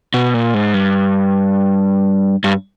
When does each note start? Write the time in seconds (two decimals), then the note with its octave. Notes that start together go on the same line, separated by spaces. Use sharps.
0.14 B2
0.34 A#2
0.54 G#2
0.74 G2
2.44 G2